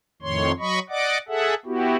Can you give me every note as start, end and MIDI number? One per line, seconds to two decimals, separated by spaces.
0.22 0.52 41
0.22 0.52 45
0.22 0.52 51
0.22 0.52 73
0.22 0.52 84
0.59 0.79 54
0.59 0.79 75
0.59 0.79 83
0.59 0.79 85
0.90 1.18 74
0.90 1.18 75
0.90 1.18 78
0.90 1.18 86
1.28 1.54 68
1.28 1.54 69
1.28 1.54 76
1.28 1.54 78
1.66 1.97 59
1.66 1.97 64
1.66 1.97 66
1.66 1.97 67